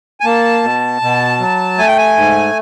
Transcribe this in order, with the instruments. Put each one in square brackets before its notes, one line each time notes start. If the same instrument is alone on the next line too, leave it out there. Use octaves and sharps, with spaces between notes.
[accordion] G#5
A#3 A5
B2
B2
F#3
A3 G#5
G5
G#5
G#2